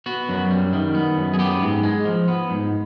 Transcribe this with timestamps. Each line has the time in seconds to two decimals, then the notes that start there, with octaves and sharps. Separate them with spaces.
0.06 B3 F#4
0.29 F#2
0.51 G3
0.73 D#3
0.95 B3
1.17 F#2
1.33 G#4
1.39 B3 G4
1.62 G#2
1.83 G#3
2.05 F3
2.28 B3
2.50 G#2